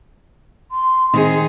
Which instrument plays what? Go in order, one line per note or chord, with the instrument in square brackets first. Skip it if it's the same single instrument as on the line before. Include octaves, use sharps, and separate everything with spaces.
[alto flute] C6
[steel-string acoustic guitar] D#3 D#4 G#4 [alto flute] C4